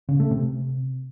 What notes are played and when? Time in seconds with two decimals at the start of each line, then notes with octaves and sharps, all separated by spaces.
0.09 C#3
0.20 A3
0.31 C3